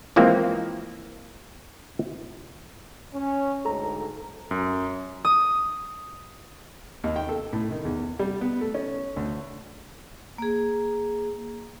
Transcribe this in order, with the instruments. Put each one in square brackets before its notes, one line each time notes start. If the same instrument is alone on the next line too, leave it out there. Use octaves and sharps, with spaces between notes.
[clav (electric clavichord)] E3 F3 G#3 A#3 C4
[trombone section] C#4
[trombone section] D2 G#2 [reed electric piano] A4 A#5
[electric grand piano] F#2
[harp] D#6
[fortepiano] D#2
G5
A4
A2
D#3
E2
G3
B3
A3
C#4
D2
[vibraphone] A#3 G#4